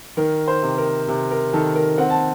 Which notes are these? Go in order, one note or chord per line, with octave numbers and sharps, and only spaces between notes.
D#3 A#4
C5
C3
A#4
C3
A#4
D#3 A4
A#4
C4 F#5
A5